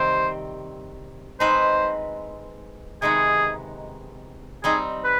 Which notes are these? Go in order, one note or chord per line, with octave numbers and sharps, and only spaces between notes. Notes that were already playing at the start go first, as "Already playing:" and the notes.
Already playing: C3 D#3 G3 C4 G4 C5
G#3 C4 D#4 B4 C5
C3 D#3 G#3 B3 D#4 G#4
G3 C4 D#4 G#4
B4